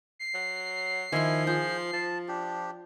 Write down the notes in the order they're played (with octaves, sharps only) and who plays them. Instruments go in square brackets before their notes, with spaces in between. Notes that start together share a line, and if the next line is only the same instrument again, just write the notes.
[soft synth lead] C7
[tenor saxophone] F#3
[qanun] D#3 C6 [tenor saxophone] F3 [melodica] E4 G#5
[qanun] F4 [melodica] G#4 C5
[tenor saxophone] F3 [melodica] A5
[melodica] D4 G4